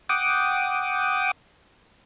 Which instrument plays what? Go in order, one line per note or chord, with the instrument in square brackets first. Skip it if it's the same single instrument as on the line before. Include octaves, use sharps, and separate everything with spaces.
[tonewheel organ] F#5 G5 D6 D#6